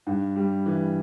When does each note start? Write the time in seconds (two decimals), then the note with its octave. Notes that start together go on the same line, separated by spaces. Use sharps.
0.07 G2
0.36 G3
0.66 E3